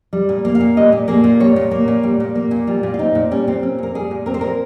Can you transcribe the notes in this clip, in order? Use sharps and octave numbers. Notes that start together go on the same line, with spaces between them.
G3
A#2
A#3
F5
A#2
G3 D#5
A#2
A#3 G#4
A#2 F4
G3 C#5
A#2
A#3
A#2
G3
A#2
A#3
A#2
G3 F4
A#2
F4
C4 D#4
A#2
G3 C#4
A#2 C4
C4 C#4
A#2 A#4
G3 G#4
A#2
C4 A#4
C5
A#2 A#4